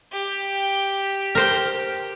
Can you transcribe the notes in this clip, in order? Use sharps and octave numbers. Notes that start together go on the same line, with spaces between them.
G4
A#4 C5 G5